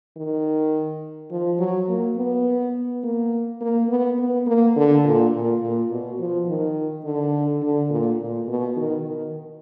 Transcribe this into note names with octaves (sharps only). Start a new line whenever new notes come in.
D#3
F3
F#3
A#3
B3
A#3
A#3
B3
B3
A#3
D3
A#2
A#2
A#2
B2
F3
D#3
D3
D3
A#2
A#2
B2
D#3
D#3